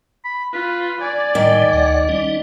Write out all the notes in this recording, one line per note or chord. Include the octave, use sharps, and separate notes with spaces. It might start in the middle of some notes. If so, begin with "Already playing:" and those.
B5
F4 B4
D5 G#5
A2 D#3 G3
D2 F#5
G3 C#4 D#4